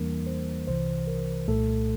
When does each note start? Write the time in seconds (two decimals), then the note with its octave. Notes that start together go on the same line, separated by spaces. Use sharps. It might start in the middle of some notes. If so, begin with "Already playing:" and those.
Already playing: E2 E3 G3 A#3 D4 A#4
0.26 C5
0.67 C2 C3 E3 C5
1.07 A#4
1.48 C2 A#2 A3 A4